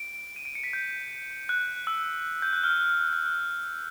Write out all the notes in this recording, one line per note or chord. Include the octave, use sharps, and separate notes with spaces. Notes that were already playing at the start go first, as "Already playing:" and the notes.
Already playing: D7
D#7
D7
C#7
B6
G6
F#6
E6
G6
F#6
F6
F6
F#6
F#6
F6